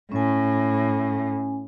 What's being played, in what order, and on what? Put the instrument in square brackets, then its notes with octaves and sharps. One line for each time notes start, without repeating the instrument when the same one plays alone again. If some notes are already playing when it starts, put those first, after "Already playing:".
[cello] A2 [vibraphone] C#4 G#5